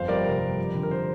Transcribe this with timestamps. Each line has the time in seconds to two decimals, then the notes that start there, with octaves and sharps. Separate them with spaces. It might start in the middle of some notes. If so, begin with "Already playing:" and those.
Already playing: G1 F2 C5 F5
0.08 G3 A#4 D5
0.24 C3 A#4
0.42 G3
0.58 F2
0.75 D3
0.83 A#4
0.91 C5